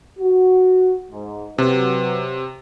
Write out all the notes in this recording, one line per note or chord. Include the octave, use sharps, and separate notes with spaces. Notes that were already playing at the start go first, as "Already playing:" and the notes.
F#4
G#2
C3 F#3 B4